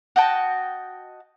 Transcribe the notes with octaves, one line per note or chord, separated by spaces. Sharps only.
F#4 D#5 G5 A5